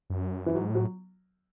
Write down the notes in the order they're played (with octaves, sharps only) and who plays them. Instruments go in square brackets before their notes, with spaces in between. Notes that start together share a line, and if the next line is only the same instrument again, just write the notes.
[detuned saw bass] F#2
[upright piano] E3
[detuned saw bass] G#2 [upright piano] F#3
[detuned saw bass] A2
[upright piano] F#3